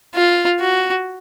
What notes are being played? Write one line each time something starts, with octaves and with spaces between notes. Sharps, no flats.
F4
F#4